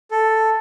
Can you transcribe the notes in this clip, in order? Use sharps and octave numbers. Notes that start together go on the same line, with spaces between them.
A4